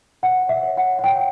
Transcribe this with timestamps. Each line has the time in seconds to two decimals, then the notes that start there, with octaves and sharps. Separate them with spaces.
0.23 C#5 F#5
0.42 C#5
0.49 E5
0.63 C#5
0.77 F#5
0.84 C#5
0.99 F#5
1.04 C#5 G5